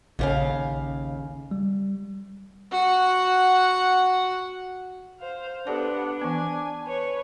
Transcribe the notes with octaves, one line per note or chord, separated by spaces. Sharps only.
A#1 D#2 C#3 F5
G3
F#4 F#5
C5 F5
B3 D4 G4 A4 D5 F#5
E3 B3 G#5
B4 C#5